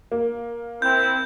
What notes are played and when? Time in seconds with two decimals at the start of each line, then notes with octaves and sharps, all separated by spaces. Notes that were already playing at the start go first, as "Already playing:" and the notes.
0.12 A#3
0.82 C4 E4 G6